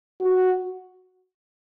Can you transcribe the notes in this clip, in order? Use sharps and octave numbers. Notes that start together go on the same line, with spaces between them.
F#4